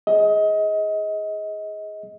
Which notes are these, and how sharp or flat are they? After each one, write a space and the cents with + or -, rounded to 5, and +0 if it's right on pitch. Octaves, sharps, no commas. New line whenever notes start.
G#4 +0 D#5 +25